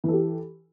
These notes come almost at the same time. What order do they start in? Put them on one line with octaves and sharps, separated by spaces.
E3 A4 G4